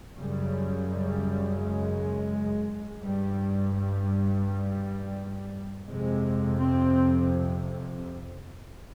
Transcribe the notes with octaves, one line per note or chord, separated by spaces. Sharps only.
F#2 C#3 G3
G3
G#3
G2 G3
G3
F2 C3 G#3
C4